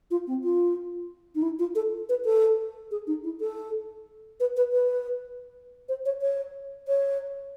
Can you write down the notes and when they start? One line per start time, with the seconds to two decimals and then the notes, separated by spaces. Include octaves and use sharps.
0.11 F4
0.27 C4
0.44 F4
1.35 D#4
1.42 E4
1.59 F4
1.75 A4
2.09 B4
2.25 A4
2.91 G#4
3.07 D#4
3.24 E4
3.40 A4
4.40 B4
4.57 B4
4.72 B4
5.89 C5
6.06 C#5
6.22 C#5
6.88 C#5